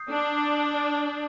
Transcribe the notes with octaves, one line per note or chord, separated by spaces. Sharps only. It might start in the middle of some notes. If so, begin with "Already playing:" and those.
Already playing: D#6 G6 C7
D4